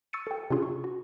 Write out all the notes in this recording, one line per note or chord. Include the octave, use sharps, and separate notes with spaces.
C#6 E6 A6 C#7 D#7
A4 G5
C3 C#4 D4 F4 G#4
C#6
F#4